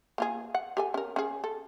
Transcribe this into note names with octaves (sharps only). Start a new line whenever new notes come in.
A#3 F4 G#4
F#5
G4 A4 G#5
C#4 A#4
C#4 G#4
A4